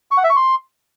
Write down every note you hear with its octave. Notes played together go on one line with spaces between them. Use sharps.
C#6
F#5
E5
C#6
C6